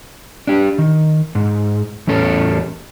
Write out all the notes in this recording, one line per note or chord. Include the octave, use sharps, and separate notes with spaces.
D4 G4
D#3
G#2
E2 A2 C#4 A4